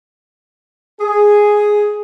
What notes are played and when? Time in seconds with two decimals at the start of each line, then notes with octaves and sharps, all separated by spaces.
1.01 G#4